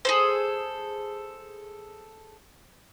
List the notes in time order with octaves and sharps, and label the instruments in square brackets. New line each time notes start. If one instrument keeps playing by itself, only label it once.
[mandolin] G#4 A4 C5